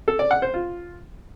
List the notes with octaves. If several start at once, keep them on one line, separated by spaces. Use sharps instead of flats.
A4
D5
F#5
C5
F4